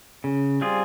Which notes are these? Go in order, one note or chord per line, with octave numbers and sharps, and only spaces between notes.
C#3
G3 C4 F4 G#4